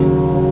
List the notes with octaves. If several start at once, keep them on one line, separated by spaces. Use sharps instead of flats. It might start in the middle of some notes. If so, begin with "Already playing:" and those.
Already playing: D#2 C#3 F#3
C#3 F#3